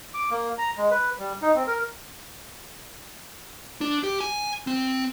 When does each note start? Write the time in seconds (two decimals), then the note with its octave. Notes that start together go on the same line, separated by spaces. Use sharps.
0.14 D6
0.30 A#3
0.58 A#5
0.77 G#3
0.91 B4
1.19 G3
1.42 D#4
1.55 C4
1.67 A#4
3.81 D4
4.04 G4
4.21 G#5
4.67 C4